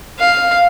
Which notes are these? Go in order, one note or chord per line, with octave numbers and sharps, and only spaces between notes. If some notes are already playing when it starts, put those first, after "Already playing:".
F5